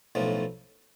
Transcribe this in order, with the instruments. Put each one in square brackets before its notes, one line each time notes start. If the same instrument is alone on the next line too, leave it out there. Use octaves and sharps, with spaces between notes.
[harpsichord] B1 A2 F3